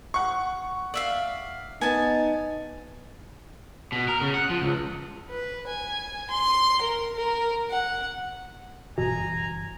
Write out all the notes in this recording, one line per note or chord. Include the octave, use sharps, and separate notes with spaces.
F#5 C#6
D5 E5 F5
B3 D#4 G#5 A5
B2
A#4
C#3
F#5
F3
C#2
B4
G#5
C6
A#4
A#4
F#5
F#1 G2 B2 E3 G#5 A#5